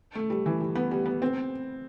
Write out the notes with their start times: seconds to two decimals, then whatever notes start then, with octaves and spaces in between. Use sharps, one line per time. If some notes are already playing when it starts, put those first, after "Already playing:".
0.15 A3
0.30 G3
0.46 E3
0.60 G3
0.75 B3
0.91 G3
1.05 B3
1.22 C4